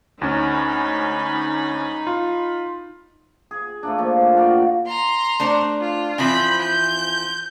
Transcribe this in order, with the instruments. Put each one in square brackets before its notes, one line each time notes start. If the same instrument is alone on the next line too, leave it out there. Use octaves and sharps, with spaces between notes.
[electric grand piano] D2 C#4 [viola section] D#4 B5
[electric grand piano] F4
[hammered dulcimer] G#4
A3 A#3 D4
F3
A#2
F#4 A#4 D5 G5
[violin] A#5 C6
[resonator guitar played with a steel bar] A3 D4 C5
[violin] F4
[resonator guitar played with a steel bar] E3 F3 C4 [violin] B5 G6
[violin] G6